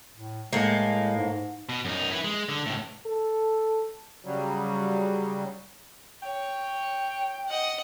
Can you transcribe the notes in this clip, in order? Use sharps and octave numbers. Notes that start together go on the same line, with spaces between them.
A2
A2 G#3 A#3
G#2
B2
F#2 D#4
E4 B4
G#3
D3
C#2 A2
A4
C#3 F#3 G3
C#5 G5
D#5 F#5